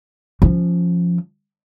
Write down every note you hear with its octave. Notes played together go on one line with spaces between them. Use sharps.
F3 C#4